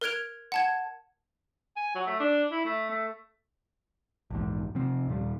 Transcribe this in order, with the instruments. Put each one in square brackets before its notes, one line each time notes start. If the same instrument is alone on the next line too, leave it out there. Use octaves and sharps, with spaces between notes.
[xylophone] A#4 F6 F#6 G#6 D7 F7
F#5 A5 G#6
[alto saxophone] G#5
F#3
A3
D4
E4
A3
A3
[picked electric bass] A#1 E2 G#2
C3 F3 C4
D#2 A#2 G3